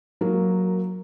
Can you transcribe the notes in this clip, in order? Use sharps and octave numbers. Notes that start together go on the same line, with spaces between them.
F#3 A#3